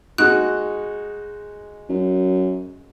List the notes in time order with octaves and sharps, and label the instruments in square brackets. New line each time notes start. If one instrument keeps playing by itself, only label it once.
[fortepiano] G#3 D#4 F#4 [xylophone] F#6
[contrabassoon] F#2